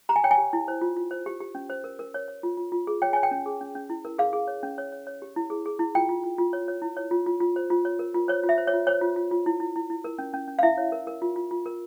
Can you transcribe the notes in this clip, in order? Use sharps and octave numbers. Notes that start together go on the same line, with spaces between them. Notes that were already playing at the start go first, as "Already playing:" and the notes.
G4 A#5
G#5
C#5 G5
G#5
G4
E4
C5
F4
F4
C5
G4
G4
C#4
C5
A#4
A#4
C#5
C#5
F4
F4
F4
G#4
C#5 G5
C#5 G#5
G5
C#4
G#4
C#4
C#4
E4
A#4
G#4 F5
G#4
C#5
C#4
C#5
C#5
C#5
G4
E4
G#4
G#4
E4
F4 G5
F4
F4
F4
C#5
C#5
E4
C#5
F4
F4
F4
C5
F4
C#5
A#4
F4
C5 C#5
F4
E5
C5
C#5
F4
C5 C#5
F4
F4
F4
E4
E4
E4
E4
A#4
C#4
C#4
C#4
F5
E4 E5
C#5
A#4
A#4
F4
F4
F4
A#4